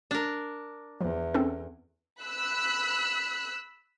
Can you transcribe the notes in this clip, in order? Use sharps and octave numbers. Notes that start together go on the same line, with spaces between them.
D4 A#4
E2 F3
C4 C#4 A4
B5 E6 F#6